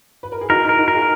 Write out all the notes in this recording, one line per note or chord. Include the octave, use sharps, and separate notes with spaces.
B4
A#4
G#4
D#4 F#4 A#4
D#4
A#4
D#4 F#4
A#4
F4 G#4